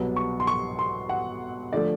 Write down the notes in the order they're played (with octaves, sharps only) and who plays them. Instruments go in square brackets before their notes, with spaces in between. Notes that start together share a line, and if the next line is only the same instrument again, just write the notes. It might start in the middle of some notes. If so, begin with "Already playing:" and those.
Already playing: [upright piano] C2 B2 F#3 B3
C#6
C6
C#6
C6
F#5
D3 F3 A3 D5